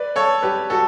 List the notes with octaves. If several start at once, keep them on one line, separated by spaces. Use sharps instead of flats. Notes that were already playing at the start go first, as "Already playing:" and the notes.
Already playing: B4 D5
A4 C#5
G4 B4
F#4 A4